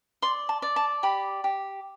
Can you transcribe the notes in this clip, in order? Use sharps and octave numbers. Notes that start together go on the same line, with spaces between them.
D5 C6
A5
D5
A5
G4 B5
G4